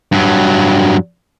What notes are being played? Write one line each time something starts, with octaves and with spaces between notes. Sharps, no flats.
G2 F#3